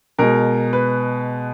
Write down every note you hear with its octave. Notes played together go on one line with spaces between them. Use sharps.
B2 G#3 A#4
B4